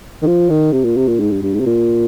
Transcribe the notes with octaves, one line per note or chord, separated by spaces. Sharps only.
D#3
F3
D#3
C3
A#2
C3
A#2
G#2
G2
G2
G#2
C3
A#2